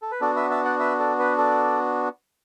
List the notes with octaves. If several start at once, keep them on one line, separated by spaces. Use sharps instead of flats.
A4
B4
B3 D4 F#4 A4 D5
B4 E5
E5 A5
D5 F#5
B4 E5
A4 D5
B4
A4 D5